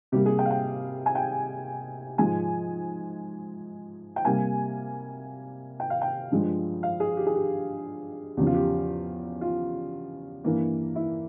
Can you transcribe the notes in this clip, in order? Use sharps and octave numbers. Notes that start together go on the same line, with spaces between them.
C3 G3 A#3 G4
G#4
G5
F5
G5
G#5
G5
G#2 F3 G#3 G#5
G5
C3 G3 A#3 G#5
G5
F5
G5
G2 F3 G#3
F5
G#4
G4
G#4
G4
E2 C#3 F3 G4
F4
G4
F4
G2 E3 A#3
E4